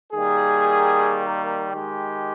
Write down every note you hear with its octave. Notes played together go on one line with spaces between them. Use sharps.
D#3 G3 A#3 G#4
D#3 G#3 G4